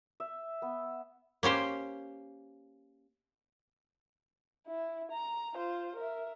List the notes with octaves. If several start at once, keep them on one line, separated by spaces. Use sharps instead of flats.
E5
B3
A#3 C#4 G4 C5
E4
A#5
F4 C5
A#4 E5